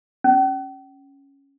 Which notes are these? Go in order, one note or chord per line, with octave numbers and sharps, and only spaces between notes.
C#4